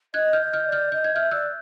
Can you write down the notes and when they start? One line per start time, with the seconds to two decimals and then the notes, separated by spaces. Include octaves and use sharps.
0.14 D#5 F#6 G#6
0.33 F6 G6
0.40 D#5
0.53 F6 G6
0.66 D5
0.72 F6 G6
0.92 D#5 G6
1.04 G#6
1.13 E5 F6 G6
1.31 D5 E6 F#6